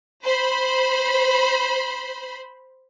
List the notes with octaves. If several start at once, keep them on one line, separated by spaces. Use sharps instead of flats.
C5 B5